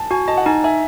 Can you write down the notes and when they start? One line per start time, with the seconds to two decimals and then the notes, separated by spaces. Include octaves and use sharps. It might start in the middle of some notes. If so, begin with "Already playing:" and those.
Already playing: G#5 A5
0.11 F#4 G#5
0.28 D#5 A5
0.37 F#5
0.46 D#4 G#5
0.64 E5 G#5